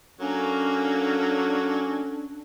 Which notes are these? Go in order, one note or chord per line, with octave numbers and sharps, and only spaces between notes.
F#3 A#3 C#4 D4 A4